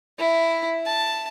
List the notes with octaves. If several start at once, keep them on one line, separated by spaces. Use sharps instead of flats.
E4
A5